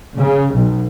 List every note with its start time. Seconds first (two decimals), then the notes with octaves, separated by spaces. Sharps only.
0.15 C#3
0.53 B1